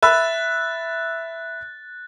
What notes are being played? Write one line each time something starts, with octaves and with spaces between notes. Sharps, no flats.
E5 B5 E6 F#6 A6